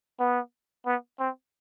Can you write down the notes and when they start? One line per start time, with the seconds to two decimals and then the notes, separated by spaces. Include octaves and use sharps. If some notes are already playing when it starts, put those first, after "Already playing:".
0.20 B3
0.86 B3
1.19 C4